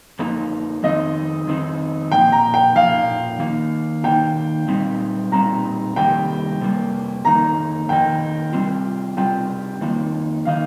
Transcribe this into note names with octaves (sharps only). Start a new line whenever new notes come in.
F2 F3 A#3 D#4
F2 D#3 C4 D#4 D#5
F2 D#3 C4 D#4
A#2 F3 A#3 G5
A#5
G5
A#2 F3 A#3 F5
D#3 A#3 D#4
D#3 A#3 D#4 G5
A#2 G3 C4 D#4
A#2 G3 C4 D#4 A#5
F2 C3 D#3 G3 A#3 G5
F2 C3 G3 A#3
F2 D#3 A#3 D#4 A#5
F2 D#3 A#3 D#4 G5
C3 G3 C4 F4
C3 G3 C4 F4 G5
F2 D#3 A#3 D#4
D#3 A#3 D#4 F5